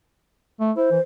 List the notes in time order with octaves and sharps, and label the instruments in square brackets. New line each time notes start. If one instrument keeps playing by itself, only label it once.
[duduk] A3
[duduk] E4 [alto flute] C5
[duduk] E3